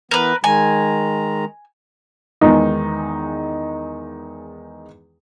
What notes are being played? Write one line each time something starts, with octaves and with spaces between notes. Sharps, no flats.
E3 B3 A#4 B4
D#3 G#3 G#5 A#5
E2 D#3 G#3 D#4